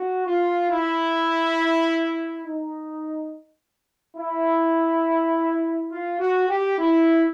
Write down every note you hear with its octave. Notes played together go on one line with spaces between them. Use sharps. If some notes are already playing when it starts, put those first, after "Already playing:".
Already playing: F#4
F4
E4
D#4
E4
F4
F#4
G4
E4